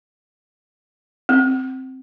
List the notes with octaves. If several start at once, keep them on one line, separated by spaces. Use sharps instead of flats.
C4